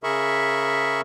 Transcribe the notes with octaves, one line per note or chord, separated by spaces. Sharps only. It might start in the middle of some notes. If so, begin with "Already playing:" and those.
C#3 G#4 A#4 E5 B5 C#6